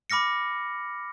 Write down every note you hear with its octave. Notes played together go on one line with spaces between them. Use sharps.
B5 D6 F6 A#6 C#7